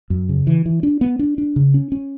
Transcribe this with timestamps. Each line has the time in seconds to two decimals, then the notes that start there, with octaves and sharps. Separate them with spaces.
0.10 F#2
0.29 C#3
0.47 E3
0.66 E3
0.83 D4
1.01 B3
1.19 D4
1.38 D4
1.56 C#3
1.74 C#4
1.92 C#4